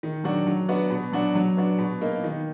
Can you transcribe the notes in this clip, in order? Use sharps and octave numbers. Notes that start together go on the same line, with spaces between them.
D#3
F#3 D4 F#4
F#3
B3 D4 F#4
B2
F#3 D4 F#4
F#3
B3 D4 F#4
B2
A#3 D#4
D#3